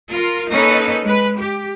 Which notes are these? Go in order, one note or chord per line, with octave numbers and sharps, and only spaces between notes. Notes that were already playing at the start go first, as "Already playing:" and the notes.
F4 A#4
A#3 C#4 D#4 A4 B4
G#3 B4
G4